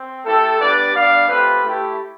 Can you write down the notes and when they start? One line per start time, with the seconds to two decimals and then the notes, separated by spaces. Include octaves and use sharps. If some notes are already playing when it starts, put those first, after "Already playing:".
Already playing: C4
0.25 A3 E4 G4 A4
0.60 G3 B3 D4 G4 B4 D5
0.94 G3 B3 D4 D5 F5
1.28 A3 C4 F4 G4 B4
1.63 A3 E4 G4